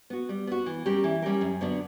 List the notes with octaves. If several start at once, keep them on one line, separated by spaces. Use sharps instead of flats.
B3 F#4
G3
B3 F#4
E3
G3 C#4 G4 A#4
E3
G3 C#4 G4 A#4
F#2
D3 F#3 B3 D4